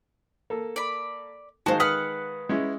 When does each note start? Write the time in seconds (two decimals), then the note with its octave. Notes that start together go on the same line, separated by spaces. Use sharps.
0.50 A#3 A4
0.76 D5 B5
1.66 D#3 G#3 F#4 C5 F5 A5
1.80 B4 F#5 D#6 F6
2.49 G#3 C#4 E4